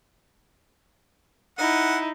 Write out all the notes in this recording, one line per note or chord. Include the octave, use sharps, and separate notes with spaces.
D#4 E4 F#5